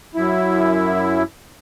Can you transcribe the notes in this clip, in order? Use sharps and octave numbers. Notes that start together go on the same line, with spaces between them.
F#2 E4